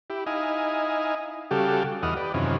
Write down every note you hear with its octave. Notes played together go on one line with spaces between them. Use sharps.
E4 G4
D#4 E4 D#5 F5 G#5
C#3 G3 F#4 G4 A4 F5
E2 E3 D#5 F#5 D#6 F6
G4 B4 D5
F#2 C3 D#3 E3 C#4 F4